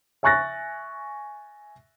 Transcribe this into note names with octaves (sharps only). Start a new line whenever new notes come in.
E5 G#5 C#6 F#6 A6 A#6